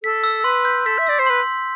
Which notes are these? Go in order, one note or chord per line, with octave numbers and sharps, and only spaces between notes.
A4 B6
E6
B4 C6
G6
A4 B6
E5
D5 E6
C5
B4 C6